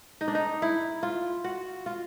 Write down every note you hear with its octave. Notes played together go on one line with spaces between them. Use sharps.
D#4
D4
D#4
E4
F4
F#4
F4